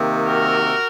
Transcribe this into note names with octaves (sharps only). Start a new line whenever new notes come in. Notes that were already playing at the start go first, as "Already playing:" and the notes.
Already playing: C3 D#3 A#3
F#4 A#4